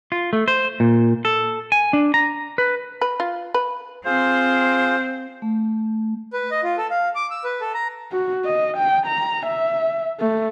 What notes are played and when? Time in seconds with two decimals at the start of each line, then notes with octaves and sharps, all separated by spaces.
0.12 F4
0.33 A3
0.48 C5
0.80 A#2
1.25 A4
1.72 G#5
1.93 D4
2.14 A#5
2.58 B4
3.01 B4
3.20 F4
3.54 B4
4.06 C4 F4 G#4 C5 F5
5.42 A3
6.33 B4
6.51 D#5
6.63 F4
6.78 A4
6.91 F5
7.15 D6
7.31 E6
7.44 B4
7.61 A4
7.74 A#5
8.11 F#4
8.45 D#5
8.77 G5
9.06 A#5
9.46 E5
10.20 A3